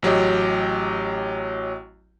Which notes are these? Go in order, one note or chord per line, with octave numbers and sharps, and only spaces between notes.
A1 F#3 G4 D#5